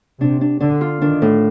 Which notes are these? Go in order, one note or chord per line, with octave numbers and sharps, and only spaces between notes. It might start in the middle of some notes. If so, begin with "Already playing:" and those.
C3 D4
D4
D3 D4
F4
D#3 D4
A2